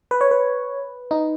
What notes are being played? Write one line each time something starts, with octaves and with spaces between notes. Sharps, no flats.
B4
C#5
B4
D#4